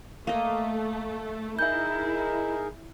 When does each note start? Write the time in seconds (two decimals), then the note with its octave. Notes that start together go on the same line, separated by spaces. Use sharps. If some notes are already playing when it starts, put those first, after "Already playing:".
0.27 A3 A#3 D#5
1.59 D#4 E4 G#4 A#4 E5 G6